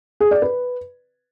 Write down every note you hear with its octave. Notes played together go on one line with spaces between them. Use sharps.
G#4
D5
B4